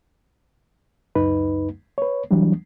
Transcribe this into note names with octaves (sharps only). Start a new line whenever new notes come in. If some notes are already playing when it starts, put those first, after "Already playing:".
C#2 F#2 D#4 B4
B4 C#5
E3 F#3 G3 D4